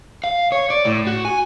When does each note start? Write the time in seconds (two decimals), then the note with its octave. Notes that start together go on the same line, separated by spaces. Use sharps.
0.24 F5
0.52 C#5
0.70 D5
0.86 A2
1.07 F#4
1.25 G#5